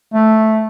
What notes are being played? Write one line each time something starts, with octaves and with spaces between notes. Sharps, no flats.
A3